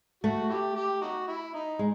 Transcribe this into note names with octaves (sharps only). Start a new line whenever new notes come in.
A3 F#4
E4 G4
G4
D#4 F#4
E4
D#4
G#3